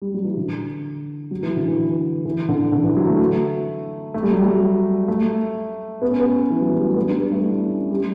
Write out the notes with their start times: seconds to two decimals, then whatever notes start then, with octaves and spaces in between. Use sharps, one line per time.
0.02 G3
0.14 F#3
0.25 E3
0.37 D3
1.31 F#3
1.43 E3
1.56 D3
1.68 E3
2.25 E3
2.49 D3
2.72 D3
2.84 E3
2.97 F#3
3.08 A3
4.14 A3
4.23 G3
4.32 F#3
4.41 G3
5.08 A3
6.02 B3
6.11 C#4
6.19 B3
6.50 E3
6.62 F#3
6.74 G3
6.84 A3
6.96 B3
7.09 D4
7.20 G3
7.32 A3
7.44 E4
7.68 C#4
7.91 G3